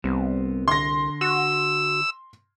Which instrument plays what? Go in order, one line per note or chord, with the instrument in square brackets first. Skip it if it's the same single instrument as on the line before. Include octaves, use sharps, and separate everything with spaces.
[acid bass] C2 [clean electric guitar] G3 B3 C4
[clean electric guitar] D3 [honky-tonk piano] C6 A#6
[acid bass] F#4 [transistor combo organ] E6